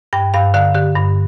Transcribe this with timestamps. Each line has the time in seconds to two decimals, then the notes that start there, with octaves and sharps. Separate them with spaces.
0.13 G2 G5
0.34 G2 F5
0.54 D3 F5
0.75 D3 G4
0.95 G2